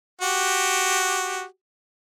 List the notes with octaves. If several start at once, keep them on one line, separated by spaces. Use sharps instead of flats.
F#4 G4